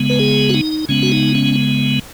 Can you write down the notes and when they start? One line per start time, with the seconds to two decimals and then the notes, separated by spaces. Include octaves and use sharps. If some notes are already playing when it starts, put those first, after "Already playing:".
Already playing: C#3 G#3 B3
0.10 B4
0.20 G#4
0.49 F#4
0.54 D#4
0.89 C#3 G#3 B3 C#4
1.03 F#4
1.12 D#4
1.35 C#4